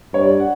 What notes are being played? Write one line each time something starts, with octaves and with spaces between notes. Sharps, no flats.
G2 C#5
D5
F#5